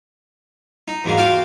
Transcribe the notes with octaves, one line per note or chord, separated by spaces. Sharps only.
D#4
E2 G#2 B2 G#3 A#3
F4 F#4 F5 G5 D6